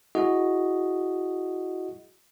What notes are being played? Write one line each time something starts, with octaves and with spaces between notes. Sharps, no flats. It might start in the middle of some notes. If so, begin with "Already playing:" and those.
E4 F#4 G#4 D#5